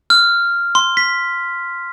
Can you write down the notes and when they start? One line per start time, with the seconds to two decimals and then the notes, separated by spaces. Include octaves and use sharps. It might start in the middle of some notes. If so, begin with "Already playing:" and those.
0.10 F6
0.75 C6
0.97 B6